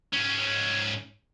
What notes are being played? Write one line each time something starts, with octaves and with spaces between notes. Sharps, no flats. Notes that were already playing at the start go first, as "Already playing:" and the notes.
G#2 C#4